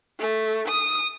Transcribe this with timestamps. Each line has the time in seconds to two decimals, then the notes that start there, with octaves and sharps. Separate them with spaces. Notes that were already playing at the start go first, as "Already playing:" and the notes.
0.19 A3
0.68 D#6